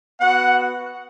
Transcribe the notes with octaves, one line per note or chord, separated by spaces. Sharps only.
B3 F#4 F#5